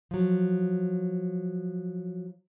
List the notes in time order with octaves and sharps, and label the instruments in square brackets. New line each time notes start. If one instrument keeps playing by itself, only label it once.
[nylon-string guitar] F3 F#3